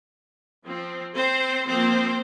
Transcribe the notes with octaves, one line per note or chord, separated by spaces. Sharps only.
F3 C4
C4 C5
F3 A#3 C4 C5